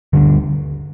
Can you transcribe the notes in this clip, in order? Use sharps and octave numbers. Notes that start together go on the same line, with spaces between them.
D2 D3 G3 D4